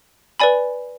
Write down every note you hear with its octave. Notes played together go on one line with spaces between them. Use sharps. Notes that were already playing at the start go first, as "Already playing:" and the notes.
B4 D5 G#5 B5